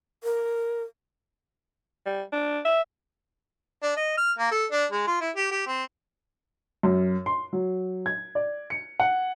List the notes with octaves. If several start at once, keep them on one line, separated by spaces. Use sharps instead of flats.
A#4
G3
D4
E5
D4
D#5
F6
A#3
A4
D4
G#3
F4
E4
G4
G4
C4
F#2
C6
F#3
G#6
D5
C#7
F#5